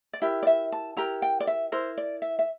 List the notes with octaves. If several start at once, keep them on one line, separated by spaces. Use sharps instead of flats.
D5
E4 G4 A#4 E5
D5
E5
A5
E4 G4 A#4 A#5
G5
D5
E5
E4 A#4 C5
D5
E5
E5